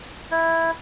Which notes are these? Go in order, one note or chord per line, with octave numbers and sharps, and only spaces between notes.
E4